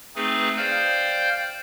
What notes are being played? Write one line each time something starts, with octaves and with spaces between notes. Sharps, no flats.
A3 C4 D#4 G#4 B4
C5 D5 F5 G5 F6 G6